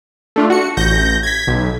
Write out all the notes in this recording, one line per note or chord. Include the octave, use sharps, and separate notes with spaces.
A3 D4 F4
F#4 C#7
A1 G6 A#6
G#6 B6
B1